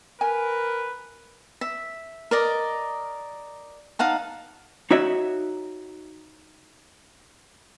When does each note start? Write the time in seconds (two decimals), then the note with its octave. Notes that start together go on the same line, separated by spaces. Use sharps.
0.21 A#4 B4 G#5
1.61 E5
2.31 A#4 D5 D#5
3.99 D#4 F5 F#5 A5
4.91 D#4 F#4 C#5 E5